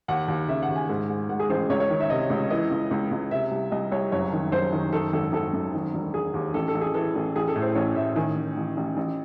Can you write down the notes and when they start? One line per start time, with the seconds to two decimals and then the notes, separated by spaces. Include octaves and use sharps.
0.08 D#2 F#5
0.28 D#2
0.48 C#3 E5
0.62 F#5
0.69 D#2
0.76 G#5
0.89 G#2
1.09 G#2
1.29 G#2 F#5
1.40 G#4
1.50 A1 C5
1.70 C#2 C#5
1.80 C#5
1.90 D#3
2.00 E5
2.10 C3 D#5
2.30 C#2
2.50 E3 D#5
2.71 C#2
2.91 C#2
3.11 C#2
3.31 C3 E5
3.51 C2
3.72 C2 D#5
3.92 C2 C#5
4.12 F#1 C#5
4.33 D#3
4.52 F#1 C5
4.72 D#3
4.93 D#3 A4
5.13 G#1 A4
5.33 G#1 A4
5.53 F#2
5.74 D#3
5.94 E1
6.14 E1 G#4
6.34 D#2
6.54 A1 A4
6.68 A4
6.75 A1
6.81 G#4
6.94 E3 A4
7.15 A1
7.36 A1 G#4
7.48 A4
7.55 A2
7.62 C5
7.75 A1 C#5
7.96 A2 E5
8.16 D#3 G#5
8.36 A1
8.57 A1
8.77 A1
8.97 A1